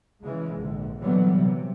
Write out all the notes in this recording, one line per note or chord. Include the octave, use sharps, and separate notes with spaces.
C#3 E3 G#3
A#1 G#2 D3
A#2 D3 E3 F#3 G3 B3
C3